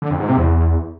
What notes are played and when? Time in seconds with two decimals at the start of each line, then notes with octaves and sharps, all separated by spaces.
0.02 D3
0.11 F2
0.20 G#2
0.29 C3
0.38 E2